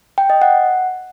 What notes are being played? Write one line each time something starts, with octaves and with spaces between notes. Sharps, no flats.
G5
D#5
F#5